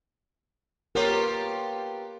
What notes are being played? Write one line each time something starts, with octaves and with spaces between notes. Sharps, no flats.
B3 F4 G4 A#4 C#5